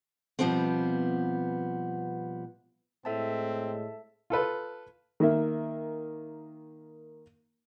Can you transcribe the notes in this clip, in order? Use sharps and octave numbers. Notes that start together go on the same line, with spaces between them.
B2 D3 F3 G3 B3 C4
A2 G#3 C4 A4 E5 A5
F4 A4 B4
D#3 A#3 E5